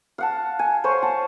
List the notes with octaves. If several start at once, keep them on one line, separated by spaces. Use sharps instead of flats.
F5 F#5 A5
G#5
C5 C#5 C6 C#6
F#5 A5